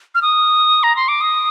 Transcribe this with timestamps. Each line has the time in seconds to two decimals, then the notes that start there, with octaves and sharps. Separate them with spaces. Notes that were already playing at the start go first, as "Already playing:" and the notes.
0.15 F6
0.22 D#6
0.83 A#5
0.96 C6
1.08 D6
1.21 D#6